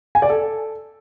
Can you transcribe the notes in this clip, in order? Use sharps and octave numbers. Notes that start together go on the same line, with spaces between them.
G#5
D5
A4